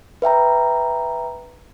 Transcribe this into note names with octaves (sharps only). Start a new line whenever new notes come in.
B4 E5 G5 A#5